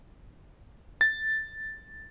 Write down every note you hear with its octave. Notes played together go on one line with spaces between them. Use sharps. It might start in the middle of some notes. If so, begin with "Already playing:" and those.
A6